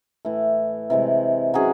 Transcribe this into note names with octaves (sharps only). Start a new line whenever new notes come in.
A2 E3 A3
C3 E3 G#3
F#3 C#4 G#4